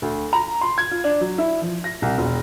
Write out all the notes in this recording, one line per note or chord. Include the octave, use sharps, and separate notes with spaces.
D2
A#5
C6
G#6
F4
D4
F#3
E4
F3
A#6
C2
E1